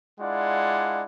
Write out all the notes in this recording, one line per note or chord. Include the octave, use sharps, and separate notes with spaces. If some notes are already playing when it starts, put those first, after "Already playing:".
G#3 D4 E4 F4 D5 F#5